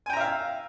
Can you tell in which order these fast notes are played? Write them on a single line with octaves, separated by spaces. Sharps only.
G#5 G5 A#5 E5 F5